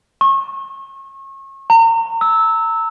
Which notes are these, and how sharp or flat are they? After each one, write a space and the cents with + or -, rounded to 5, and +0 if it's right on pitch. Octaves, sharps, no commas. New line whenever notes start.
C#6 -35
A#5 -35
E6 -15